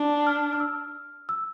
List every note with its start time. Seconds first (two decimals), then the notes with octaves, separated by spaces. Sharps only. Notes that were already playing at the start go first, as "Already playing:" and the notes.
Already playing: D4
0.27 F6
0.53 F6
0.60 E6
1.29 E6